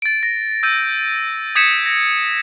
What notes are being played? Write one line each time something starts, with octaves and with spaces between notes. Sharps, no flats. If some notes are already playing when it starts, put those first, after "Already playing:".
A6 D7
A#6
E6 G6 D#7
D#6 G6 G#6 B6 C#7 E7
A#6